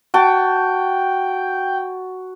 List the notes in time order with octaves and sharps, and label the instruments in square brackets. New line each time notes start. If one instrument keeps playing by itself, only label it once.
[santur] F#4 A5 [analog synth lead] G5